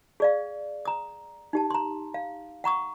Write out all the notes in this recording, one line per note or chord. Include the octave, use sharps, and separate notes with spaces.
G#4 D5 F5
A#5 D#6
D#4 G4 A5
A#5 C6
F5
F#5 A#5 C#6 D#6